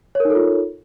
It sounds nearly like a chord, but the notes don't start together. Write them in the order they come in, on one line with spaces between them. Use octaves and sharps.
C#5 A#4 D#4 A4 F4